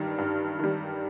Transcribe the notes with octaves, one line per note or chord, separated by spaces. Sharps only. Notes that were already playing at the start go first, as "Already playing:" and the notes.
Already playing: G2 D#3 G3
G2
D#3 G3